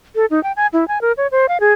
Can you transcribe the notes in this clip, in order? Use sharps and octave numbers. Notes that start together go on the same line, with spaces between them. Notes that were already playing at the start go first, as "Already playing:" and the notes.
A4
D#4
G5
G#5
E4
G#5
A#4
C#5
C5
F5
G#4